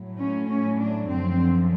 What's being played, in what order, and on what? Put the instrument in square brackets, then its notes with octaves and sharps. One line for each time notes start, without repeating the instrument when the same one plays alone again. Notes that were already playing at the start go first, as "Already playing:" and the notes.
Already playing: [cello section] A2 F#3 A3
C#4
C#4
D4
F#2 D3 F3 C4